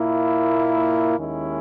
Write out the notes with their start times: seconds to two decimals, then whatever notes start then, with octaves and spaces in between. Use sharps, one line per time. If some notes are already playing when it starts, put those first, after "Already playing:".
Already playing: A#2 A#3 E4
1.18 D#2 D#3 G#3 C#4 E4